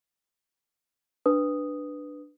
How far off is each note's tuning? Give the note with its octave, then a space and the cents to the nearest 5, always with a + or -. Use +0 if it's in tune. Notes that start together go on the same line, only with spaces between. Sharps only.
D4 +10 B4 +0 D#6 +0